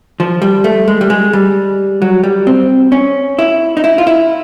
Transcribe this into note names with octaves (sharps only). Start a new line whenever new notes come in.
F3
G3
A3
G#3
G3
G#3
G3
F#3
G3
C4
C#4
E4
D#4
E4
F4
E4